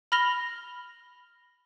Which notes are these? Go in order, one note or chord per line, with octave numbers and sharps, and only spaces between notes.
B5 F6 A#6 F7 G7